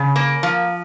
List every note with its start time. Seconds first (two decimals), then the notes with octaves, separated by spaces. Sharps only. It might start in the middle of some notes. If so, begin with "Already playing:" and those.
Already playing: C#3
0.16 A#3
0.43 F3